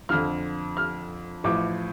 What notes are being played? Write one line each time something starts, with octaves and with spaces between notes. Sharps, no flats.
F2 D3 F3 F6
F6
A1 A2 F3 D6